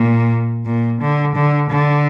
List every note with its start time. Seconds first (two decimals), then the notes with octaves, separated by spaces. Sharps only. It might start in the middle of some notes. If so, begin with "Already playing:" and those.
Already playing: A#2
0.65 A#2
1.00 D3
1.35 D3
1.70 D3